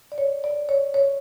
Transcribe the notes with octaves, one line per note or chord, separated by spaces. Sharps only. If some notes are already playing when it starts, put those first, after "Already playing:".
D5
C#5
D5
C#5
C#5